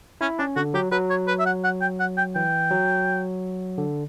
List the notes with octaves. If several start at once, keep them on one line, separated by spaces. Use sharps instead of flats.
C#4 E4
C#4 D4
D3 F#4
F#3 G4
F#3 B4
C#5
B4
E5
F#5
F#5
G5
F#5
G5
E3 G5
F#3
D3